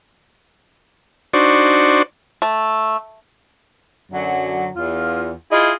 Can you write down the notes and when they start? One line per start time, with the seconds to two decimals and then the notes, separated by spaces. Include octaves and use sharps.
1.33 D4 D#4 F#4 C5 D5 C#6
2.42 A3
4.12 F#2 D3 F#3
4.75 E2 F4
5.52 E4 F4 G#4 D#5